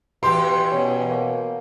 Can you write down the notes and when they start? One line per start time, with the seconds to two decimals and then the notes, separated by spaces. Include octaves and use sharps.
0.23 E2 B2 G4 C6
0.72 B2 C#4
1.09 A#3